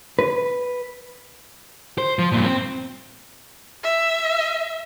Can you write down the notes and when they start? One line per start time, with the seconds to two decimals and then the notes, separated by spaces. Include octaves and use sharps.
0.19 B4
1.98 C5
2.19 F3
2.32 G2 A#2
2.45 C4
3.83 E5